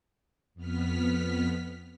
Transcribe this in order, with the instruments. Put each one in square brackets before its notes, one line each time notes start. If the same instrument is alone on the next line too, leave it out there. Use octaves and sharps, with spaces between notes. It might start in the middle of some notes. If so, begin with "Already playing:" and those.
[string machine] F2 B3 F6 B6